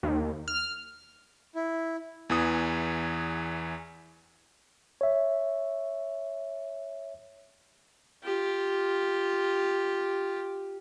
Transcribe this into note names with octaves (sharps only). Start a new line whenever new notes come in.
D#2
F6
E4
E2 E3 D#6
C#5 E5
F4 G4